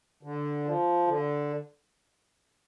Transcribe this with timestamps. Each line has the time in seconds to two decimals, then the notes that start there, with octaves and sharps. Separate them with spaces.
0.23 D3
0.65 F3
1.08 D3